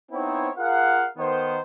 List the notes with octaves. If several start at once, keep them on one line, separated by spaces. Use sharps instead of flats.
B3 C4 D#4 E4 C5 C#5
F4 G#4 A#4 F5 F#5
D#3 B3 C5